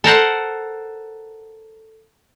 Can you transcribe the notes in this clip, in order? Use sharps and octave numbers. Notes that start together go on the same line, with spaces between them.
A4 A#4 C5 F#5